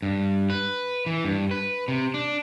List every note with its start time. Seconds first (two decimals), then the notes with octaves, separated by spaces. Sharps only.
0.02 G2
0.50 B4
1.06 E3
1.25 G2
1.51 B4
1.88 C3
2.14 D4